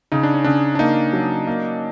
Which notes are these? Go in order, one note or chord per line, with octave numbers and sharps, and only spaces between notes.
C#3 D#4
D4
C#4
C#3 D4
D4
A#3 D#4
F#3
A#3